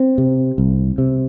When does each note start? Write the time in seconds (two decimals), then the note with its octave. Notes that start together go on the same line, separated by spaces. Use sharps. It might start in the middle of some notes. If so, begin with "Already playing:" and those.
Already playing: C4
0.18 C3
0.58 C2
0.98 C3